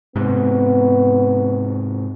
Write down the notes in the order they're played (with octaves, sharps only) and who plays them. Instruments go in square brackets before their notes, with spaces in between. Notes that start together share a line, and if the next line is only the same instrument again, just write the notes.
[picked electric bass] G#2 C3 [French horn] B3